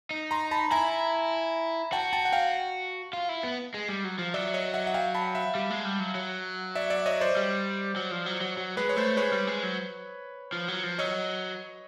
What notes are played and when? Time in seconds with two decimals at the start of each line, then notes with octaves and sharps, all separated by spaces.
0.11 D#4
0.31 A#5 C6
0.51 A5 B5
0.71 E4 G#5 A#5
1.92 F#4 G5 A5
2.13 G5 A5
2.25 F#5
2.32 F5 G5
3.13 F4
3.29 E4
3.43 B3
3.74 G#3
3.88 G3
4.04 F#3
4.19 F3
4.34 F#3 D5 E5
4.54 C#5 D#5
4.74 E5 F#5
4.87 F#5
4.94 F5 G5
5.15 A5 B5
5.35 E5 F#5
5.55 G3
5.70 G#3
5.85 G3
6.00 F#3
6.15 F#3
6.75 D5 E5
6.90 D5 E5
7.06 C#5 D#5
7.21 C5 D5
7.37 G3
7.96 F#3
8.11 F3
8.26 F#3
8.41 F#3
8.57 F#3
8.77 G#3 B4
8.89 C#5
8.97 A3 C5
9.17 G#3 B4 C#5
9.33 G3
9.47 G#3
9.63 F#3
10.53 F3
10.68 F#3
10.84 F3
10.98 F#3 C#5 D#5